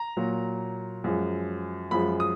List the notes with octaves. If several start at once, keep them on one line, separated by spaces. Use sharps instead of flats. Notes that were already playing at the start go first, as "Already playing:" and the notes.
Already playing: A#5
A#2 F#3
F#2 F3 G#3
F#2 F3 G#3 B5
D#6